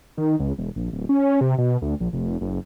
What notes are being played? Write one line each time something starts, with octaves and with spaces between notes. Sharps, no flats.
D#3
C#2
E1
A#1
D1
C#4
C3
B2
D2
A#1
F1
F#1